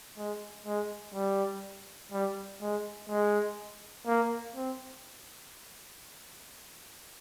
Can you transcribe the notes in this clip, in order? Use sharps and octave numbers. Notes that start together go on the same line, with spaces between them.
G#3
G#3
G3
G3
G#3
G#3
A#3
C4